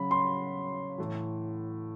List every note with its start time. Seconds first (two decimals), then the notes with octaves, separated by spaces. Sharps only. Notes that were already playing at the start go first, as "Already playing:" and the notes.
Already playing: C#3 F#3 B5
0.11 C6
0.98 A2 E3